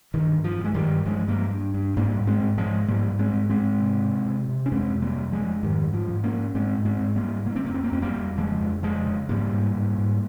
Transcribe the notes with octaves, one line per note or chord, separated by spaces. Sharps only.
G2 D#3
G2
F3
G2 G#3
D#3 G3
G2
G2 F3 G#3
G2 G3 A#3
G2
G2
G#2 G3 A#3
G#2
G#3 C4
G#2
F3 G#3
G#2
G#2 G3 A#3
G#2
G#3 C4
G#2
G#3 C4
G#2
C3
C3
C3
C3
C#4
F2 G#3 C4
C3
G3 A#3
F2
F3 G#3
F2
G#2 D#3 G3
G#2
F3
G#2
A#3 C#4
G#2
G#2 G#3 C4
G#2
G#3 C4
G#2
G3 A#3
G#2
C#3 A#3
C4
A#3
F2
C4
A#3
F2 C4
G3 A#3
F2
C#3 F3 G#3
F2
C#3 F3 G#3
C#3
G#2 G3 A#3
G#2
G#2
G#2